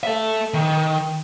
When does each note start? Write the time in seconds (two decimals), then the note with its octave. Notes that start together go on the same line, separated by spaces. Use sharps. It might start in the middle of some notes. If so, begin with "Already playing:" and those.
0.03 A4 E5
0.54 D#3